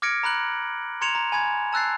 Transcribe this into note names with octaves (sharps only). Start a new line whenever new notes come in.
D6 F6 G#6 A#6 C#7 D7
A#5 B5 F#6 F#7
A#5 C6 G#6 C#7 E7 F7
A#5
G#5 B5 G#6
A5 E6 F#6 A6 C7